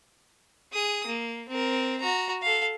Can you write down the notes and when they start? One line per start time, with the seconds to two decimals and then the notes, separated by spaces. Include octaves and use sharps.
0.73 G#4 D#6
1.06 A#3
1.49 C4 A#4
2.00 F#4 A#5
2.42 A4 F5